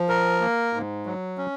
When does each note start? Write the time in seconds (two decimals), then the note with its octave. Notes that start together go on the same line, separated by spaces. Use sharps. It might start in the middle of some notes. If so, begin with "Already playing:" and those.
Already playing: F3
0.09 A#4
0.41 A#3
0.73 G#2
1.06 F#3
1.38 C#4